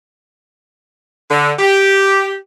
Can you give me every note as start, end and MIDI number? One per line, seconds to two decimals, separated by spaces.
1.31 1.53 50
1.59 2.35 67